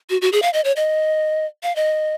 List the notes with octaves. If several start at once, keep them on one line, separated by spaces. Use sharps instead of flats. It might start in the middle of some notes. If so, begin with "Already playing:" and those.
F#4
F#4
G#4
F5
D#5
C#5
D#5
F5
D#5